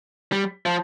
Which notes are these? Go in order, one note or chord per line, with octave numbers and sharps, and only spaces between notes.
G3
F3